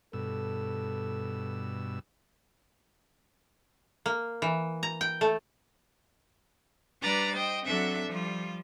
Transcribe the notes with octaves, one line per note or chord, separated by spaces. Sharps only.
G2 B2 A4 E6
A#3
E3
A#5
G5
A3
G3 D4 B4 D5 A#5 A6
C5 D#5 G5
F#3 C4 D4 A4 E5
F3 G3 F4